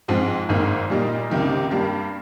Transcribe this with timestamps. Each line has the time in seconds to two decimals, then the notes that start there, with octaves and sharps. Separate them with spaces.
0.08 G#2 F3 G#3 C4
0.49 G#1 G#2 D#3 A#3
0.90 A#2 G3 A#3 D#4
1.30 C#2 C3 D#3 A#3
1.70 G2 G3 A#3